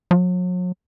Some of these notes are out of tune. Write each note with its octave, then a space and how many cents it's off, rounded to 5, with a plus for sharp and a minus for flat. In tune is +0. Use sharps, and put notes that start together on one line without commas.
F#3 -40